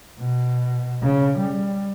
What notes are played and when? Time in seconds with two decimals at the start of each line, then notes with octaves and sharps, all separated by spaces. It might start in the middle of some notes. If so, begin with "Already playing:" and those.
0.19 B2
1.03 C#3
1.38 G3